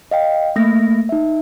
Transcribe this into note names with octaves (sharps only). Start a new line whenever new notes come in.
D#5 F5 G5
A3 A#3 A#6
D#4 E5